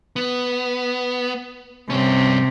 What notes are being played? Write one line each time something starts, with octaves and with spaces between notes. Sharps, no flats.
B3
G2 C3 C#4